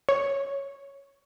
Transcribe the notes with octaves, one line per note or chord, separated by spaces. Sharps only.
C#5